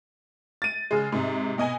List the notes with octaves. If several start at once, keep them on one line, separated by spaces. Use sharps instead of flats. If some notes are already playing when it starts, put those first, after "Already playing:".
A6 D#7
C#3 G#3
G#2 C3
B2 D#5 G#5